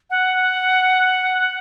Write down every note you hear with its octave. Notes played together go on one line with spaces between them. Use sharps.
F#5